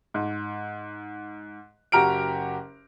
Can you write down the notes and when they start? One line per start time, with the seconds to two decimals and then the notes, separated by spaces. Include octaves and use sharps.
0.14 G#2
1.92 F#1 F#4 G4 A#5 F6 D7